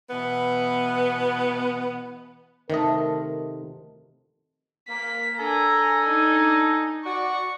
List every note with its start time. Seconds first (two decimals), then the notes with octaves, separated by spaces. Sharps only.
0.10 B2 E3 B3
2.70 C3 D#3 A3 A#4 D#5
4.89 A#3 B6
5.39 D4 A4 G#5 A#5
6.06 D#4
7.06 F#4 D5 C#6